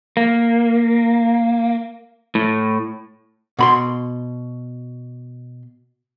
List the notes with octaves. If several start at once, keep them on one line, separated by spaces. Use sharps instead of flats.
A#3
A2
B2 B5 C6